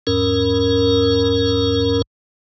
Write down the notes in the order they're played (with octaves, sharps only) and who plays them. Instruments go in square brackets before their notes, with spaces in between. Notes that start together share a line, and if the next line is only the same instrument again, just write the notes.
[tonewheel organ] E2 G#2 C#4 A#4